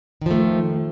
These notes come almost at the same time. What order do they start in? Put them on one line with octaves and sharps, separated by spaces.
D#3 F3 A3